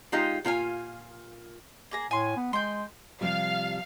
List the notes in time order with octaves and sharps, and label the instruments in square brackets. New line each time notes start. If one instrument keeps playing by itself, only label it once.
[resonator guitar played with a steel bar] G#3 D#4 F4 G4 D#5 F5
A#2 F4 F5 G#5
[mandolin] A#3 G#4 A#5
[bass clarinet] A2 [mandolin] G#5 C6
[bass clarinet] B3
[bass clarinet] G#3 [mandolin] G5 C6
[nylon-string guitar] C3 F3 G3 [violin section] F5